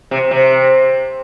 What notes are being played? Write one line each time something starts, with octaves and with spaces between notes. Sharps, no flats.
C3
C3